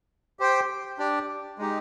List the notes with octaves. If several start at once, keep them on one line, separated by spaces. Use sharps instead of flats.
G4 C5 G5
D4 G4 D5
G#3 D#4 G4